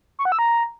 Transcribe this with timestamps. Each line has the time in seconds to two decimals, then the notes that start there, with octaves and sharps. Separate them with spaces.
0.19 C#6
0.25 F#5
0.32 E6
0.39 A#5